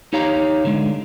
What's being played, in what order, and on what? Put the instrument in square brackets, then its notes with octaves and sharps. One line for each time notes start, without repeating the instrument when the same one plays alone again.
[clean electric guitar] D#4 G4 C#5 F5 A#5
D3 G#3